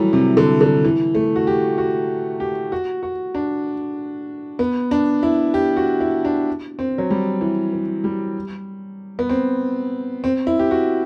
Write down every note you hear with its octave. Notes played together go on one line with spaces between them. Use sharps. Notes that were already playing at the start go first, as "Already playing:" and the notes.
Already playing: E3 F#3 G3 A3
C3
D3
D3
E3
A3
F#4
G4
F#4
G4
F#4
F#4
D4
B3
D4
E4
G4
F#4
E4
D4
C4
F#3
G3
E3
E3
G3
B3
C4
C4
E4
G4
F#4